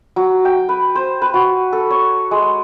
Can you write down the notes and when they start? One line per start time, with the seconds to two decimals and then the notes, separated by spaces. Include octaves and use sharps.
0.16 F#3
0.45 G5
0.69 B4
0.95 C5
1.22 B4
1.34 F#4
1.72 A4
1.91 C#5
2.31 G#3